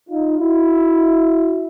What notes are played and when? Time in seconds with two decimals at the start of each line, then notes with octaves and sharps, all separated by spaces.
0.09 D#4 F4
0.38 E4 F#4